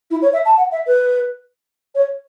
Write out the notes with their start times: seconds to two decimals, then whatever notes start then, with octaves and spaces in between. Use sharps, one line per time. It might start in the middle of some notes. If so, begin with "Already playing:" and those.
0.10 E4
0.22 C#5
0.33 E5
0.45 A5
0.57 F#5
0.71 E5
0.87 B4
1.95 C#5